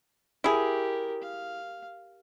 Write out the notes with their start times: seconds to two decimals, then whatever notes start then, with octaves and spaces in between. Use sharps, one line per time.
0.44 E4 G4 G#4 A#4
1.23 F5